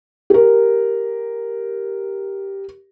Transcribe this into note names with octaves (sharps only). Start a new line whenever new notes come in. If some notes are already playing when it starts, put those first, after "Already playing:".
G4 A#4